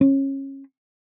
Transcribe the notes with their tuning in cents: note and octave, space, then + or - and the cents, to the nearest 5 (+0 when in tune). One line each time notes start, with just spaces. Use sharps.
C#4 -25